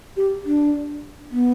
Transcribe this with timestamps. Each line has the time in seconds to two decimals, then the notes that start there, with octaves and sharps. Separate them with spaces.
0.17 G4
0.45 D4
1.31 B3